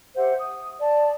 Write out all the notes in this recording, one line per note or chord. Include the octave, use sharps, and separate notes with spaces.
G4 C5 E5 F#5
D#6
D5 A5